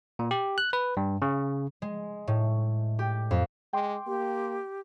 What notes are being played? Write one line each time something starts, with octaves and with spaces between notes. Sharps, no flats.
A#2
G4
F#6
B4
G2
C#3
G#3
A2
G4
F2
G#3 G5 C6 D6
A#3 G4